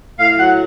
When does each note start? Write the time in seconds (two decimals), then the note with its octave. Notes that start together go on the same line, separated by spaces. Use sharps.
0.19 A2 F5
0.38 F#3 F#5